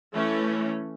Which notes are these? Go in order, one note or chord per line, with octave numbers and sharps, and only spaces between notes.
E3 A3 C#4